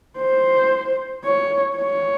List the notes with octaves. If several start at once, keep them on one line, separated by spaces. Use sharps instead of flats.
C5
C#5
C#5